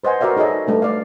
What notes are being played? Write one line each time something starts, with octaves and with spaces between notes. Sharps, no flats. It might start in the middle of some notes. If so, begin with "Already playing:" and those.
B4 C5 D#5 F#5 G#5
F#4 A#4 D5 E5 F5
D#4 G#4 A4 C#5 D#5 E5
G3 A3 D4 B4
A3 D5 F5